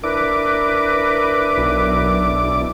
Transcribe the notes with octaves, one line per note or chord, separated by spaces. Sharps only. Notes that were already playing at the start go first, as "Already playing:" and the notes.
D4 E4 A#4 B4 D6
B1